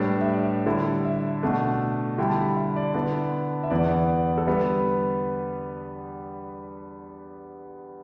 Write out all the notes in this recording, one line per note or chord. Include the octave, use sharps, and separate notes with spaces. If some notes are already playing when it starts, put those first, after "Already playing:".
Already playing: A2 G3 D4 B4
E5
D5
D3 G3 E4
E5
B2 A3 D4
D3 G3 E4 G5
A5
B5
E5
D5
D3 B3 E4 D5
E5
E2 E3 B3 D5
A4
D3 G3 B3 B4